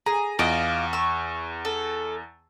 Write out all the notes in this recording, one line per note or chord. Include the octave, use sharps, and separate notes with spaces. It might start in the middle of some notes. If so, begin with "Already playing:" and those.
G#4 A#5
E2 F4 D5 D#5
C#6 E6
A4